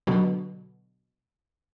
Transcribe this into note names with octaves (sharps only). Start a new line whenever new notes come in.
B2 D3 F#3